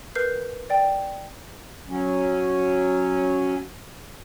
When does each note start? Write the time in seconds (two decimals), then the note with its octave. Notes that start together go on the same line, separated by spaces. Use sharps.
0.15 A#4 B4 F6 G6 C7
0.70 D5 G5
1.89 F#3 C#4